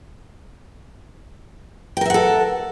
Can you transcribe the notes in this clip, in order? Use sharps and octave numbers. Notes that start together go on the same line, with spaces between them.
A4 A#4 E5 F#5 G5